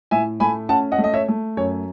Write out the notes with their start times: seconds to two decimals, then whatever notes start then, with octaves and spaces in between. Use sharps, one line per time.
0.11 A2 E5 G#5
0.40 A3 G#5 B5
0.69 C#4 F#5 A5
0.92 D#5 F#5
0.98 A3
1.04 D#5
1.14 C#5 E5
1.28 A3
1.57 F#2 C#5